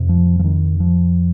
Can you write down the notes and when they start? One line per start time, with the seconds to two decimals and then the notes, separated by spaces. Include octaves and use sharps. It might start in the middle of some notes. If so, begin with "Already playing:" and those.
Already playing: F2 C3
0.09 F3
0.39 F3
0.44 D#3
0.80 F3